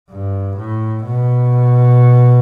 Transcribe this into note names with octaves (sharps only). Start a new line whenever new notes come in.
G2
A2
B2